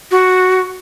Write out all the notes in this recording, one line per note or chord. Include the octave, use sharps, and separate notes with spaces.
F#4